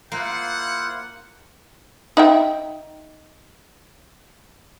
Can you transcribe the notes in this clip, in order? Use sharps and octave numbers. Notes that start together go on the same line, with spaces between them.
A#3 E4 F4 C5 F#5
D#4 E5 G5